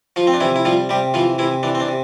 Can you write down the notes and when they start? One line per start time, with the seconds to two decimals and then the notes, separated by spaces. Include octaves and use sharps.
0.16 F3 F4
0.27 C4
0.34 D4
0.40 C3 E3 E4
0.56 E4
0.65 F3 G3 F4
0.89 C3 G3 G4
1.14 E3 F3 F4
1.38 C3 E3 E4
1.63 E3 D4
1.75 C4
1.80 D4
1.89 C3